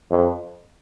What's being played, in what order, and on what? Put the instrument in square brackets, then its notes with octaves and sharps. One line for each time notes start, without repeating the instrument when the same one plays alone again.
[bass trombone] F2